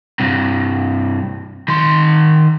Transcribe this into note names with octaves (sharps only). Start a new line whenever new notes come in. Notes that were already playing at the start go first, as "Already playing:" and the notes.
G2 C3
D#3 C6